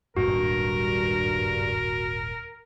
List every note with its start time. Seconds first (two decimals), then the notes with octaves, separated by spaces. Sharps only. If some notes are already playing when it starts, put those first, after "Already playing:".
0.17 D#1 G#1 G2 F#4 A#4